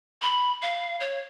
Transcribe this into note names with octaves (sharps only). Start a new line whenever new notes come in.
B5
F5
C#5